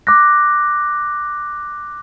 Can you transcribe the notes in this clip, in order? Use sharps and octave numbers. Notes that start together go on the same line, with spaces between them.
D6 F#6 A#6